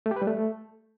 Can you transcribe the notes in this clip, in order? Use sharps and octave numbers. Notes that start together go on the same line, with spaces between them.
A3
G4
B4
G3
A3